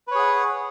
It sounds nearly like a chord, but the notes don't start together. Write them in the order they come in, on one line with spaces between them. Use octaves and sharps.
B4 C#5 G#4 F#5